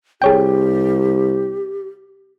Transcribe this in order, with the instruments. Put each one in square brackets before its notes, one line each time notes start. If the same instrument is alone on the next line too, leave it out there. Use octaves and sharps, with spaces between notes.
[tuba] C2 [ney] G4 [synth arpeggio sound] G#4 C#5 G5